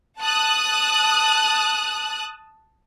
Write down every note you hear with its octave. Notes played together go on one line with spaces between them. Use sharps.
A5 D#6 F#6